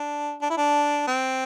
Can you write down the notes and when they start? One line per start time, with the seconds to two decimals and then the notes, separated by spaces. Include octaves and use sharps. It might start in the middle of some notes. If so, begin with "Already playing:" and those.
Already playing: D4
0.41 D4
0.50 E4
0.57 D4
1.07 C4